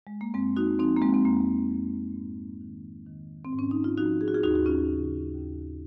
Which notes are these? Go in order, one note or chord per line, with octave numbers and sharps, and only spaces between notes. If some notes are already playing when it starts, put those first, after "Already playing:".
G#3
A#3
F2 G#3 C4
D#4 F#4
F3 C4 D#4
A#3
G#3 C4
C4
F2 A#3
F2
G#2
D#3
D#3
C4
G#2
C#4
D#4
F4
F3 D#4 F#4
G#4
F#4
F4 G#4
D#2 D#4 F#4
F#4
C#4 F4
C#3
D#2